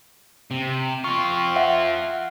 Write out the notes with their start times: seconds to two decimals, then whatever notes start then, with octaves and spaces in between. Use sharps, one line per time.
0.51 C3
1.04 C4 F4 C#6
1.56 E5 F#5